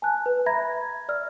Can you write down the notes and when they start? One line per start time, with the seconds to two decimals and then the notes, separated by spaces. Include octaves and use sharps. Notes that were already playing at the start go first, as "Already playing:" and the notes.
0.02 G#5 A5 F#6
0.26 B4
0.46 E5 A#5 B5 G#6 A#6
1.09 D5 E6 F6